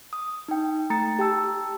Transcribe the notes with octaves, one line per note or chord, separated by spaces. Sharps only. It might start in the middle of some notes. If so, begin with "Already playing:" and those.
D#6
D#4 G5
A3 A#5 A6 C#7
G4 G5 A5 E6